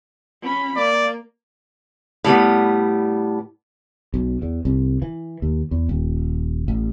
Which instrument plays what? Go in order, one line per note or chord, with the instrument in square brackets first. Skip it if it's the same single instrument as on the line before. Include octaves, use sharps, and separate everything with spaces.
[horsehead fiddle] C#4 B5
[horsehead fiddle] A#3 [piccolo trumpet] D5
[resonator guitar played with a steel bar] A2 G3 B3
[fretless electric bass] B1
E2
C2
E3
D#2
E2
D#1
A1